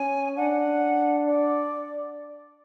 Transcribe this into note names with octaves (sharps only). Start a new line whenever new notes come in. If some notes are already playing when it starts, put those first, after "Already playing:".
Already playing: C#4 G#5
D4 F#5
D5